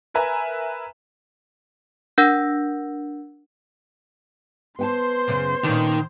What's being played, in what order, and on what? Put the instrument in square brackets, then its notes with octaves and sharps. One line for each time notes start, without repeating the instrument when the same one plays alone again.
[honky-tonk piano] A#4 B4 E5 G#5 A#5
[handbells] D4 A#4 F#5 E6 G6 A#6
[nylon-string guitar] B3 G5 A5 [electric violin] C5 C6
[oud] F#2 C#3 C#4
[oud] A#2 C#4 D4 [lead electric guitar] D#3